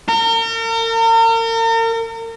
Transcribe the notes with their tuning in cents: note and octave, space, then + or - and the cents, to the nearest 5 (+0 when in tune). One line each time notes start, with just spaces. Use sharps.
A#4 -40